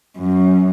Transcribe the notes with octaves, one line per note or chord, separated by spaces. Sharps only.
F#2